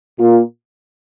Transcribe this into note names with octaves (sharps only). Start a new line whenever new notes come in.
A#2 A#3 F4